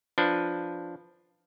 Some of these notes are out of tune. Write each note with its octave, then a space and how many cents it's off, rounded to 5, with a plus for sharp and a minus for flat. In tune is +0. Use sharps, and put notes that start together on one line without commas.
F3 +0 D4 +0 B4 +0